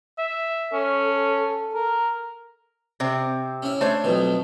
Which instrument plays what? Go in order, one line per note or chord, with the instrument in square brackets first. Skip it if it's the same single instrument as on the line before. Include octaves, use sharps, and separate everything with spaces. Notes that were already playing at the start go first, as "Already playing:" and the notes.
[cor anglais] E5
[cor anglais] C#4 [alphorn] A4
[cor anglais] A#4
[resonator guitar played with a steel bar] C3 C4
[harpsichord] C#4 E4
[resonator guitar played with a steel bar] A3 C5 C#5 [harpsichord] D4
[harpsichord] B1 F2 B2